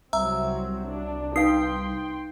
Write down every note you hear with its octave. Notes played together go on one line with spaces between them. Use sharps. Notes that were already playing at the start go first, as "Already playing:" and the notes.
C2 F#3 C4 E5 A#5 E6
D4
D#4 B4 F5 G5 C6 D#6 C7